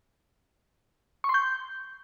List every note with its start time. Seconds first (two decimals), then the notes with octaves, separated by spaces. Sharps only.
1.24 C#6
1.29 C6
1.34 G6